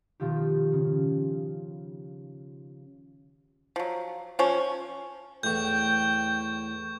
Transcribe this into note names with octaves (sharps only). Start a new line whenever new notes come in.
B2 D#3 F3 F4 G4
C#3
F3 F#3
F3 C#4
E2 A2 G5 C#6 G6